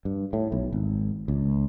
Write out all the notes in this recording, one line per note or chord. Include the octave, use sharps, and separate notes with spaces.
G2
A2
B1
G#1
C#2